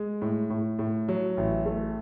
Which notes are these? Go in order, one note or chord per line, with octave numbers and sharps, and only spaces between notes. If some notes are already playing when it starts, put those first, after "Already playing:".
Already playing: G#3
A2
A2
A2
F#3
A1
A3